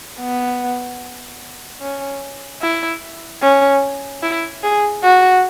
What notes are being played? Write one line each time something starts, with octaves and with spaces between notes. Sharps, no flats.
B3
C#4
E4
C#4
E4
G#4
F#4